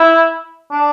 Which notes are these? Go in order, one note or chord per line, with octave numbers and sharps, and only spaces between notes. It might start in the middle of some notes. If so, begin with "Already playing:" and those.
Already playing: E4
D4